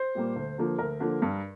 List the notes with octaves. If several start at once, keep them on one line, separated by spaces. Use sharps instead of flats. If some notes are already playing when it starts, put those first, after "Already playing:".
Already playing: C5
A#2 G3 A#3
D2
D3 F3 A#3
D2 A#4
D3 F3 A#3
G2